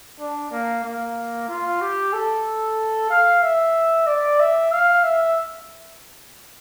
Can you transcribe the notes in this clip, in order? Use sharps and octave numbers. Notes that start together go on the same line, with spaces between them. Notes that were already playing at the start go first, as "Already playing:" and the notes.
D4
A#3
A#3
F4
G4
A4
F5
E5
D5
E5
F5
E5